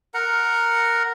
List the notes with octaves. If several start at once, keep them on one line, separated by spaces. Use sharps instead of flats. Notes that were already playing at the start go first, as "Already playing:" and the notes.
A#4 F#5 A#5